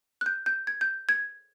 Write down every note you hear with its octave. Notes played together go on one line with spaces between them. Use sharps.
F#6
G6
G6
G#6
G6
G#6